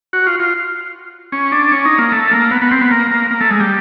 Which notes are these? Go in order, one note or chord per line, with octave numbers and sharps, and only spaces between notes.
F#4
F4
F4
C#4
D4
C#4
D#4
A#3
A3
A#3
B3
B3
C4
B3
A#3
A#3
A#3
A3
G#3
G3